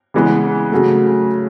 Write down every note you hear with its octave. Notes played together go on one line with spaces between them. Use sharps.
C#3 E3 G#3 B3
C#3 F#3 A3